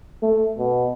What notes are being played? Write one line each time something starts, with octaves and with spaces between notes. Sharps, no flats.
A3
B2